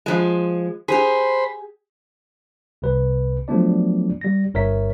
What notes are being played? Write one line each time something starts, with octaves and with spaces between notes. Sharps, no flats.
F3 G#3
G4 G#4 C5 B5
C2 C3 B4
F3 F#3 A3 B3 D4 D5
G3 A#6
G1 G2 A#4 C#5 E5 B6